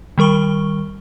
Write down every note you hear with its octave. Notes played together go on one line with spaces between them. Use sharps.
D#3 G3 A#4 C#6 G7